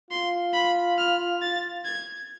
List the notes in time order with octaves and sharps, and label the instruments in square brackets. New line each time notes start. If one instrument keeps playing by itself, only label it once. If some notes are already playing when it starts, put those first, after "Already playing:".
[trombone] F4 [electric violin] C6
[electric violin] B5
F6
A6
G#6